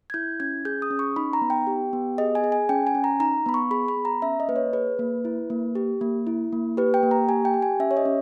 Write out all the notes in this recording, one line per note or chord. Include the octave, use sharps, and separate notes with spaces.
G#6
E4 G6
C#4 G#6
G#4 G6
D#6
C#4
C#6
D#4 B5
A#5
B3
G5
G4
B3
G#4 D#5
G#5
G#4
G#5
C#4 G5
G#5
C#4
A#5
D#4 A#5
B3 B5
C#6
G#4 B5
B5
B3
A#5
C#4 E5
D#5
A#3 B4
C#5
G#4 B4
A#3
E4
A#3
G4
A#3
E4
A#3
G4 B4
G5
A#3
A#5
G4 G#5
G5
G4
G#5
C#4 E5
C#5
D#5
C#4